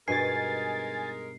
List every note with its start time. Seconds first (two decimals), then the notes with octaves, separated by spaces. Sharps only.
0.08 G2 B2 G#3 D#4 A#4 G#5 A6 C7